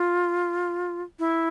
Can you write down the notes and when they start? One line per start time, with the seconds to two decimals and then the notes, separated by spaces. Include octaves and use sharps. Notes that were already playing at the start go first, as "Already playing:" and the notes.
Already playing: F4
1.19 E4